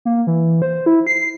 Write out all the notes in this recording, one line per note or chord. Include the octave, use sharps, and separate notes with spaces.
A#3
E3
C5
E4
C7